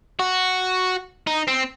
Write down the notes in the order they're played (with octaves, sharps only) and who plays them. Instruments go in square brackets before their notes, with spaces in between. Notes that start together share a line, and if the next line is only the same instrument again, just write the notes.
[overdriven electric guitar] F#4
D#4
C4